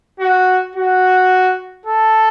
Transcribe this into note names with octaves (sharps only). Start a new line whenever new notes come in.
F#4
F#4
A4